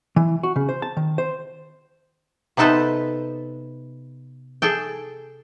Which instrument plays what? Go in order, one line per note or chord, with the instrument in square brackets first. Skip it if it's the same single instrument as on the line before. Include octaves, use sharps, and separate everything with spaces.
[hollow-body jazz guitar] E3
F#4
C#3
C5
A5
D#3
C5
[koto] C3 B3 D#4 A4 B4 C5
G#4 A4 G5